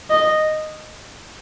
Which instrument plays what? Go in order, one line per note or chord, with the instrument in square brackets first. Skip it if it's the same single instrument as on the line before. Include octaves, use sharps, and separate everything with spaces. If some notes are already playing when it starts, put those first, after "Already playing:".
[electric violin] D#5